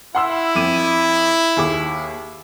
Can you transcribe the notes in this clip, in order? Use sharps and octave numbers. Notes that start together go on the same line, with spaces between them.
E4 F#5 C6 E6
F2 D6 D#7
D#2 G#4 D6